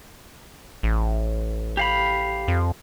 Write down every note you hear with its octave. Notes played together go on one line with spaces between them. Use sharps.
A1
G4 F5 B5
F2